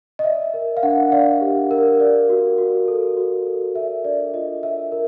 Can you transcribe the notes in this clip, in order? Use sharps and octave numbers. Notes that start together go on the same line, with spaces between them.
D#5
D5 E5
A#4
F5
D4 F#5
D5 F5
G4
A#4
D5
F#4
F#4
A4
F#4
A4
A#4 E5
D4 D5
F4 D#5
A#4 E5
A#4